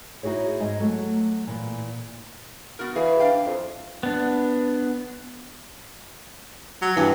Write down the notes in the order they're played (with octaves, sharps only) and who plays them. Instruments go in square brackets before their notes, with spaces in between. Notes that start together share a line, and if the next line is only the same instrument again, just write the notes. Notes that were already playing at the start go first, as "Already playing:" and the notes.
[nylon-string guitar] D#4 E4 F#4 G#4 C#5
G#2 G#3 D#5
F#3 A3 F#4
A#2 E3
[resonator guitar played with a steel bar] B3 F#4 A#4
[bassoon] E3 [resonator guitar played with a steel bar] G#4 F5
[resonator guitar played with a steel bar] D4 F5 G5
[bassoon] F2
[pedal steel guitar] B3 D4
[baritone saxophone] F#3
[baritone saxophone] G2 [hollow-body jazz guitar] E3